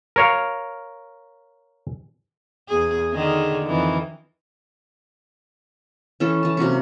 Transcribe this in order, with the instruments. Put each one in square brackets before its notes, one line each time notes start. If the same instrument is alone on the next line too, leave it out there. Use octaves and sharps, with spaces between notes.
[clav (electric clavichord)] A#4 C#5 F5
[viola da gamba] E2 G#4
D3 D#3 G#4
F2 D#3 E3
[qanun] E3 C#4 A4
E3 A5
C3 F#3 A#3 C#4